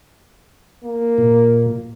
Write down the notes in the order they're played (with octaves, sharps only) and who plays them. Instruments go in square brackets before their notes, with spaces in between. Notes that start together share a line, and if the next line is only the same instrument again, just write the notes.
[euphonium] A#3
[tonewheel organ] A#2